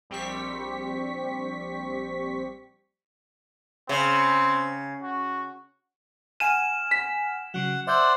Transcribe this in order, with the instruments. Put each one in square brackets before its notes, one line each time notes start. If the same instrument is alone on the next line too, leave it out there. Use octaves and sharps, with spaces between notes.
[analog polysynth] A#1 G3 C4 G4 C#6 B6
[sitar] C#3 [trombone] C4
[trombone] F#4
[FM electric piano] F#5 G#5 F6 [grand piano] D#7 [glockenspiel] E7
[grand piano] B6
[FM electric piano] C#3 F#3 [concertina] F#5
[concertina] C5 D5 F#5 [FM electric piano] E5 E6 G6